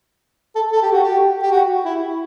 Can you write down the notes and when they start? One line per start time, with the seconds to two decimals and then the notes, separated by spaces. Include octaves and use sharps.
0.55 A4
0.72 A4
0.82 G4
0.92 F#4
1.03 G4
1.43 G4
1.51 F#4
1.85 E4